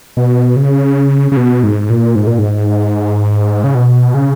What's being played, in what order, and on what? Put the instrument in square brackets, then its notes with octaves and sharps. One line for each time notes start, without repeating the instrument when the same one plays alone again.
[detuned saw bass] B2
C#3
C#3
B2
G#2
A#2
G#2
A#2
G#2
C#3
B2
C#3